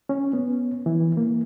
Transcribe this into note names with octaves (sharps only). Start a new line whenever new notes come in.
C#4
B3
E3
A#3